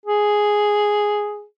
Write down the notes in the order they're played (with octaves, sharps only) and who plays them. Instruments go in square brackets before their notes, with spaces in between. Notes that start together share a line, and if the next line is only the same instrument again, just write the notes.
[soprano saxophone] G#4